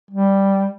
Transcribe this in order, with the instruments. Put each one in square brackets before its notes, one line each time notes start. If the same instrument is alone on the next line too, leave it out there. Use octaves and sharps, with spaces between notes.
[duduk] G3